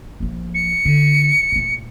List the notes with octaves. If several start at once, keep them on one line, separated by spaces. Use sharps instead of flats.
A#1 F3
C#7
D3
A#2 A3